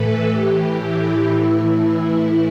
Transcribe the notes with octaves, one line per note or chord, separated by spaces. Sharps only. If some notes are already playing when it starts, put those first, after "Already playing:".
Already playing: A2 E3 A4 B4
A2 E3 G4
E4
A2 E3 E4